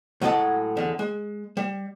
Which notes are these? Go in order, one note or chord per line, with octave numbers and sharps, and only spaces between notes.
A2 F#3 G#3 D#5 F#5 A5
E2 D3
G#3
G3